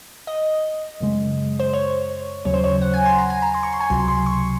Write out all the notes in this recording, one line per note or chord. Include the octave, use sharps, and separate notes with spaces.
D#5
F#2 C#3 G#3
C5
C#5
D#2 C#3 F#3 C#5
C5
C#5
F#5
G#5
C6
A#5
G#5
A#5
C6
C#6
C6
G#5
C#2 C3 F#3 C6
C6
C#6